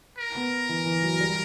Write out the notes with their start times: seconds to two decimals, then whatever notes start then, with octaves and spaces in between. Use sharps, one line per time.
0.18 A#4
0.35 B3
0.69 E3
0.86 E3
1.03 F#3
1.20 G3